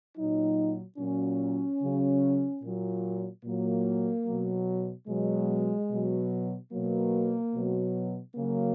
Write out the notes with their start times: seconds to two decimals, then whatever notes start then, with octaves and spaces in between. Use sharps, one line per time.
0.17 A#2 F#3 D#4
0.98 A#2 F#3 C#4
1.81 C#3 F#3
2.63 A#2 F#3
3.44 A#2 F#3 A#3
4.25 B2 F#3
5.08 B2 F#3 G#3
5.90 B2 F#3
6.72 B2 F#3 A#3
7.53 B2 F#3
8.35 C#3 F#3 A#3